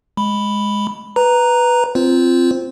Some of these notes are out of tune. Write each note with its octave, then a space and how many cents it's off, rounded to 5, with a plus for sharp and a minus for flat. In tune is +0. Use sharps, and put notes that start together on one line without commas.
G#3 +0 B5 +0
B4 +0 A#5 +0
C4 +0 F4 -15 C5 +0